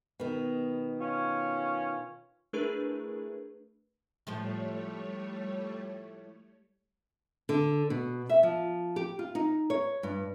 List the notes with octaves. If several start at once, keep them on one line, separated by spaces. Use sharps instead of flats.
B2 D#3
C#4 F4
A3 D4 E4 G#4 A#4 B4
A2 F3 G3 A3 C5 C#5
D3
B2
E5
F3
G4
F4
D#4
C#5
G2